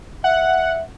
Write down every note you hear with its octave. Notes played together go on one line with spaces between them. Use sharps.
E5 F#5